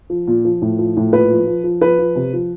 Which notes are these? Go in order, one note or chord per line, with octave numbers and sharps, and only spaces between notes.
F3
A#2
F3
A2
F3
A2
A#2 B4
F3
F3
F3
F3 B4
F3
C3
F3